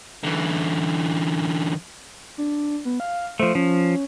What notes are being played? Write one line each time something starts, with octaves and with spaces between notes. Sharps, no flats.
D3 E3
D4
B3
F5
F3 A3 C5
F3 C#4